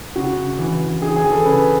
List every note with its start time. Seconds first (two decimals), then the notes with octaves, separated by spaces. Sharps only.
0.16 C#3 F#4
0.37 C#3
0.59 E3
0.80 E3
1.02 E3 G#4
1.16 G#4
1.24 E3
1.31 A4
1.45 C#3 B4